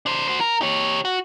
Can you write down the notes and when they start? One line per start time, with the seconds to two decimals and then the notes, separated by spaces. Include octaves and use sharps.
0.06 D4 C5
0.28 F#4 C5
0.41 A#4
0.62 G4 C#5
1.05 F#4